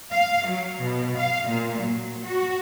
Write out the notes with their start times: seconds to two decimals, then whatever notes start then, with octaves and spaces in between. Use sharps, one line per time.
0.11 F5
0.47 F#3
0.82 B2
1.17 F5
1.48 A#2
1.80 F#3
2.25 F#4